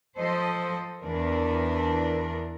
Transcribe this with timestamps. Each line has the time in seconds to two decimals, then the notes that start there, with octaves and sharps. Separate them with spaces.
0.18 F3 A4 C5 D#5
1.02 E2 E3 D4 A#4